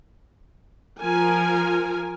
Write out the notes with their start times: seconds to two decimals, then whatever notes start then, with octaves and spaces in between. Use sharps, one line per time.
1.00 F3 A#4 G#5